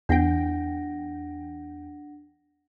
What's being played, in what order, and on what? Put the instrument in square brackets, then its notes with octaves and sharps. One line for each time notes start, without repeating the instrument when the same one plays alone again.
[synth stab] E2 G5 [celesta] D4 F#5 A#6